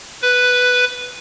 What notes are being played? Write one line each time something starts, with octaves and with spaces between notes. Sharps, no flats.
B4